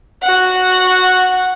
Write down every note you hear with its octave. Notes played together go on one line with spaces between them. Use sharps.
F#4 F#5